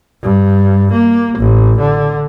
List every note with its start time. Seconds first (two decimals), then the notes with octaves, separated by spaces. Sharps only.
0.23 G2
0.93 A#3
1.39 A1
1.80 D3